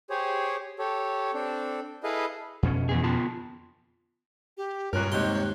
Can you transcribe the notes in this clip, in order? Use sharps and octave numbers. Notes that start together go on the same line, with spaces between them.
G4 G#4 C5 C#5
G4 A4 C#5
C4 D4 A4
E4 G#4 A4 B4 D#5 F5
F2 B2 C#4
E2 B3 G#4
B3 F4 A5
G4
C#2 G2 A#2 A#4 C#5 F#6
D#2 G#2 C3 D#3 C6